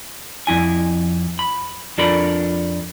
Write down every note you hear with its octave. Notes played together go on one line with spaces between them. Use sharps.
F2 E4 G#5
B5
F2 D4 F4 A4 A#4 B5